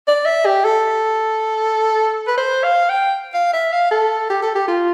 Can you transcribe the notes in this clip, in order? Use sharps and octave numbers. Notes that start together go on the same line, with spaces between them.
D5
E5
G4
A4
B4
C5
F5
G5
F5
E5
F5
A4
G4
A4
G4
F4